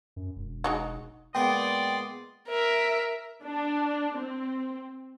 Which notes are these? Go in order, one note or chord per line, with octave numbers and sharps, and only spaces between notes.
F#2
E1
G#3 D#4 F#4
A#2 G#3 B3 D5 G5 C6 D#6
A#4 E5
D4
C4